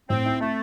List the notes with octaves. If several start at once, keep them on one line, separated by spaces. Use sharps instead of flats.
A2 C4
E4
A3 C4